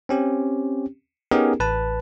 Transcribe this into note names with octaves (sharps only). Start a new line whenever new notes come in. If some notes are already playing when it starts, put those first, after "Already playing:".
C4 C#4 G4
B3 C#4 D#4 G4 G#4 A#4
A1 B4 A5